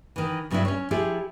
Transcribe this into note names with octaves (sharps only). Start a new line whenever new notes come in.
D#3 E3
G2 C#3 F#3 C4 D4 E4
C#4 C#5
F3 E4 G4 G#4